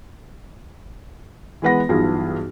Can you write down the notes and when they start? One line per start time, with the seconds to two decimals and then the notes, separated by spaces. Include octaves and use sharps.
1.62 E3 G#3 B3 B4 F#5 A#6
1.89 B1 G2 E3 B3 F4 G#4